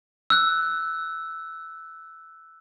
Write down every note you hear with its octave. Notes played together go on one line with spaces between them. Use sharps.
E6 F#6